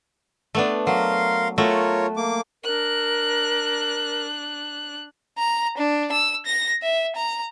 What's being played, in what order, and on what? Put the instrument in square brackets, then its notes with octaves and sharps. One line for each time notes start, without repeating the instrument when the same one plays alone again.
[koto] A3 B3 D4
[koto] F#3 [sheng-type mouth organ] A#4 F5 C6
[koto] A3 F#4 [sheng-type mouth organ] F4 A#4 C#5
[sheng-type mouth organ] A#3 D6
[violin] D4 F#6 [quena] A#4
[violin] A#5
D4
E6
A#6
E5
A#5